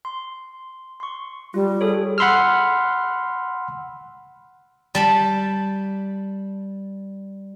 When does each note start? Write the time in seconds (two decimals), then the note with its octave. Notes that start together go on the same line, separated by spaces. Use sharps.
0.05 C6
1.00 C6 C#6
1.54 G3 F4
1.81 G#4 A4 C#5
2.18 F#5 B5 C6 E6 F6
4.95 G3 A5 B5